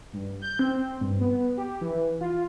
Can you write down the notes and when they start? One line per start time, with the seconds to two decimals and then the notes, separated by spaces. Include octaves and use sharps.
0.13 G2
0.42 G6
0.59 C4
1.01 G2
1.21 B3
1.57 G4
1.81 E3
2.21 F4